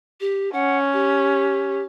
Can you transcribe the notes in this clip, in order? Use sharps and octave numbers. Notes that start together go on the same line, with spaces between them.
G4
C#4 F#5
G4